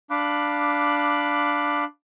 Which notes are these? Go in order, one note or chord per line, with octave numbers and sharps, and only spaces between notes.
D4 F5 B5 D6 F#6